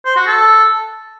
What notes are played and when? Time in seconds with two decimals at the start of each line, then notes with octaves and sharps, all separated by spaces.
0.05 C5
0.16 F#4
0.27 A4